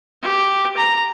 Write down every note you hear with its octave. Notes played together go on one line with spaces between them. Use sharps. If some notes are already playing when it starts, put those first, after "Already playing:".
G4
A#5